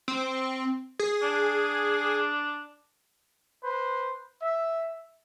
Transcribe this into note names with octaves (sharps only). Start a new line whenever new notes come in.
C4
G#4
D4
B4 C5
E5